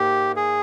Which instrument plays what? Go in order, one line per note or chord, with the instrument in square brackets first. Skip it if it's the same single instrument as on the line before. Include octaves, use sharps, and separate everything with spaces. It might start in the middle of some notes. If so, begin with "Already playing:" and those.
Already playing: [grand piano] G#2 A#3 [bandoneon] G4
[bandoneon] G#4